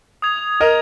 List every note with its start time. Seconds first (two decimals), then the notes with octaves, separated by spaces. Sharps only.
0.22 D#6 G#6 F7
0.60 A#4 D#5 D#6 G#6 F7